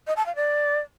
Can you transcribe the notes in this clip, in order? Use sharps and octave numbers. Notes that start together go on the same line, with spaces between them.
D#5
A5
F5
D5